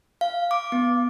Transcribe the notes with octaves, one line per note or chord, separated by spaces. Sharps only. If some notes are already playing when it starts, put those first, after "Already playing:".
F5
D6
B3